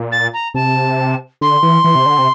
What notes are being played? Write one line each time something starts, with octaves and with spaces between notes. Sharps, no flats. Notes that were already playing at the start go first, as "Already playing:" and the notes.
Already playing: A#2
A6
A#5
C3 A5
D3 C6
E3
E3
C3
D3
C3